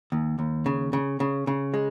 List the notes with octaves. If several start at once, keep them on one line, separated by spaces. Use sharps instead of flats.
D#2
D#2
C#3
C#3
C#3
C#3
G#3